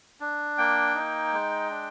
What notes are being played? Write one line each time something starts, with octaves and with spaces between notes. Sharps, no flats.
D4
A#3 G5
D#4
G#3
D4